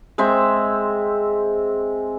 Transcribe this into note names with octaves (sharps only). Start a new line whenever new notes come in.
G#3 C4 E5